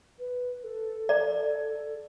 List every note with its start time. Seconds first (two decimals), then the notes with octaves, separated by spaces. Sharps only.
0.19 B4
0.64 A4
1.09 D5